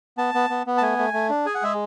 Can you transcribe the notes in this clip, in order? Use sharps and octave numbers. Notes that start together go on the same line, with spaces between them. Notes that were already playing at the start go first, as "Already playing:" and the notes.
B3 A5
B3
B3
B3
A5
A3 G#5
A3
A3
D4
G#4 G#5
F#5
G#3 E5